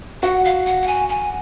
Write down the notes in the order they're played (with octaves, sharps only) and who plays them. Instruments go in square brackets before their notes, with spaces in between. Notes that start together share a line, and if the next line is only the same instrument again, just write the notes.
[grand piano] F#4 [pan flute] F#5
[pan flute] F5
F#5
F#5
G#5
G#5